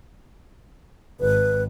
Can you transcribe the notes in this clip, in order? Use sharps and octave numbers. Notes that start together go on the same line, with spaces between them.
G#1 B4